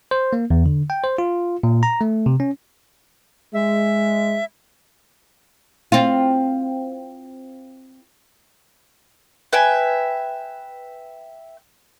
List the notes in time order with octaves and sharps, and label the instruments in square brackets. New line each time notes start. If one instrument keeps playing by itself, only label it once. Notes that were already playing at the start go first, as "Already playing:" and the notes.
[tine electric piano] C5
A#3
E2
D3
G5
C5
F4
A#2
A#5
A3
C3
C#4
[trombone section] G#3 [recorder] E5
[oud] C4 F4
[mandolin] B4 E5 G5 G#5